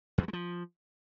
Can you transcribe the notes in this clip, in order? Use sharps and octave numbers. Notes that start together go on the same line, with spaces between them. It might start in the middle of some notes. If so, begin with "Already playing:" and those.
E2
F#3
G#3
F3